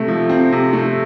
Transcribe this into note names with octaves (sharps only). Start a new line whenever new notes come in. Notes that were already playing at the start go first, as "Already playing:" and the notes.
Already playing: C3 A3
F3
C4
C3
A3